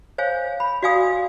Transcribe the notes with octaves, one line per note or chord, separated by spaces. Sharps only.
C5 C#5 F5 G#5
B5
F#4 D5 F5 G#5 D#6